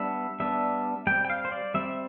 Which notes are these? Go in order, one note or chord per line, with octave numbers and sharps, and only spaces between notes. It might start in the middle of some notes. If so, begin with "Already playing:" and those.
Already playing: G3 B3 D4 E5
G3 B3 D4 E5
G3 C4 G5
G5
F5
C5
D5
G3 C4 E5